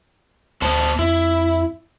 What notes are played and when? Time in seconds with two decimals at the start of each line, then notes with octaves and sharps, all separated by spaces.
0.62 D2 B3 C5 A5
0.99 F2 E4